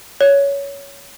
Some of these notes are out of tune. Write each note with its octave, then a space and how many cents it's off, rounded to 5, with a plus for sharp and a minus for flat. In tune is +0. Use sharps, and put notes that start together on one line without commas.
C#5 +15